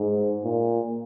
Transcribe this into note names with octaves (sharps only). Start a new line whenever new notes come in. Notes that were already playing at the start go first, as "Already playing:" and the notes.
Already playing: G#2
A#2